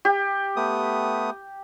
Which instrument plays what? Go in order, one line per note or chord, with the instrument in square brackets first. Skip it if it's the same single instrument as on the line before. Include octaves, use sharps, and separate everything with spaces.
[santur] G4
[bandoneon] A3 B3 D#6